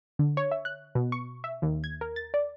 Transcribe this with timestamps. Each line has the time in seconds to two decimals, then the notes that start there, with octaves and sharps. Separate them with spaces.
0.19 D3
0.37 C#5
0.52 E5
0.65 F#6
0.95 B2
1.12 C#6
1.44 E5
1.62 D#2
1.84 G#6
2.01 A#4
2.16 A6
2.34 D5